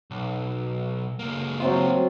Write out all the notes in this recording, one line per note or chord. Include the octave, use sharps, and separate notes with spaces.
B1
C#2 A#3
F#3 C4 F4